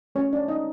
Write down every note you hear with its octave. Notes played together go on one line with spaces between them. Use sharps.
A3 C#4 F#4 C#5
D4 D5
D#4 D#5